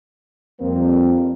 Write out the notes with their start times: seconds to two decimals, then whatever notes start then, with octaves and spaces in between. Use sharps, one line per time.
0.60 F2 G3 A#3 C4